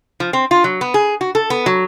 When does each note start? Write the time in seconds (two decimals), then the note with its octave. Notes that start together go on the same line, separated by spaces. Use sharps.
0.20 F3
0.33 C4
0.51 F4
0.64 F#3
0.81 B3
0.94 G#4
1.21 F#4
1.35 A4
1.50 B3
1.66 F#3